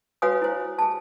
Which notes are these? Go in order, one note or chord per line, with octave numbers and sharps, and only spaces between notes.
F#4 B4 C#5 F5 G#5 D#6
E4 C5
G#4 A5